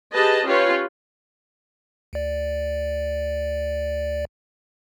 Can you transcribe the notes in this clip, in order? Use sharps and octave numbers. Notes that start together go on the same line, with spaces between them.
G4 G#4 B4 D#5 A5
C#4 F4 G4 B4 C#5
D2 D5